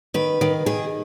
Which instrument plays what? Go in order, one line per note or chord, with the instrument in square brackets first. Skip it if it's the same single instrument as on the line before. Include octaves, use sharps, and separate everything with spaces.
[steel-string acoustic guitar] D#3 B4
D#3
D#3 G#4